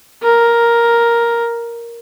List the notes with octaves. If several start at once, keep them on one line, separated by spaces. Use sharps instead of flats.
A#4